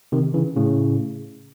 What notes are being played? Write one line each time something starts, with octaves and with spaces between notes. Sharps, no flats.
C3 D#3
C#3 E3
A2 C#3